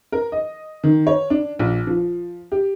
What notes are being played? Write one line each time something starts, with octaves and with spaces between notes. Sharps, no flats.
A#4
D#5
D#3
C#5
D4
A#1
F3
G4